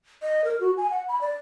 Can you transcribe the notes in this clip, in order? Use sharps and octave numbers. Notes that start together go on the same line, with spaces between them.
D#5
A#4
F#4
G#5
F#5
B5
D5